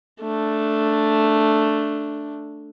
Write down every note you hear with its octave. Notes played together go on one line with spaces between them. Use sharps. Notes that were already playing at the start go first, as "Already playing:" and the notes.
A3 D4